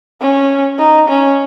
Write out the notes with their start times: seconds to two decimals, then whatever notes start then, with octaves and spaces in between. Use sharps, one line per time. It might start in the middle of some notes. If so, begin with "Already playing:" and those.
0.21 C#4
0.78 D#4
1.09 C#4